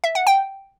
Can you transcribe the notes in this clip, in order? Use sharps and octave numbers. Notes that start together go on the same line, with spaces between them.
E5
F#5
G5